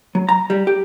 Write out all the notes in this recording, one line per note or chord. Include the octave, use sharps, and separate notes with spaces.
F#3
A#5
G3
G4